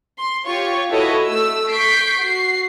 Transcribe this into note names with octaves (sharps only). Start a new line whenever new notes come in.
C6
F4 G4 C#5 C#6
E4 F#4 A4 B4 C#5 D#5
A3 E6
C#6 G6 B6 C7 D7
F#4 C7